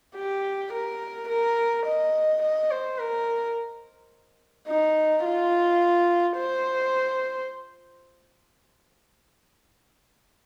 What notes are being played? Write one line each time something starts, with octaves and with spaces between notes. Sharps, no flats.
G4
A#4
A#4
D#5
D#5
C5
A#4
D#4
F4
C5